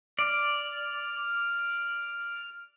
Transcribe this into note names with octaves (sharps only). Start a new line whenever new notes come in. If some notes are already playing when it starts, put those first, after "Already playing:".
D5 F6